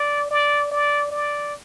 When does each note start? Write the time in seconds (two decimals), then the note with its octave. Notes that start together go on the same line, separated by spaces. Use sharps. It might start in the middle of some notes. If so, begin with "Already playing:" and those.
Already playing: D5
0.31 D5
0.71 D5
1.11 D5